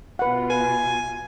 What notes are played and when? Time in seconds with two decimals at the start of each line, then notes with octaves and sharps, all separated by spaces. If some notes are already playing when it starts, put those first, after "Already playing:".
0.19 B2 F4 B4 F#5
0.50 B4 G#5